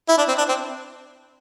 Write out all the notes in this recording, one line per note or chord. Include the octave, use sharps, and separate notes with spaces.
E4
D4
C4
D4
C4